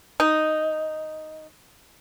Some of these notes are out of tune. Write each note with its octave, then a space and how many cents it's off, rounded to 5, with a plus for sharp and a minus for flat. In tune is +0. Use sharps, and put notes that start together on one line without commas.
D#4 +0